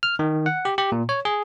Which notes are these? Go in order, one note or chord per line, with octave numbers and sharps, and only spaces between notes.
F6
D#3
F#5
G4
G4
A#2
C#5
G#4